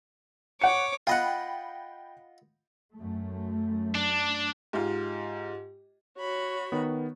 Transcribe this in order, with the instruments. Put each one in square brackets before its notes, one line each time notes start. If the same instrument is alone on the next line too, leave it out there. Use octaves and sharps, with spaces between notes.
[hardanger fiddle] C#5 D6 [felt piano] F#5 C#7
[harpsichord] F4 D#5 F#5 [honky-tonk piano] G5 B5
[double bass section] F#2 A3
[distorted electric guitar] D4
[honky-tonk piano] G#2 F4 [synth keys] G4
[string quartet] F#4 C#5 B5
[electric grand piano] D#3 B3